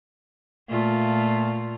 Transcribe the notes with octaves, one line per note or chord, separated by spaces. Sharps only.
A#2 A3 F4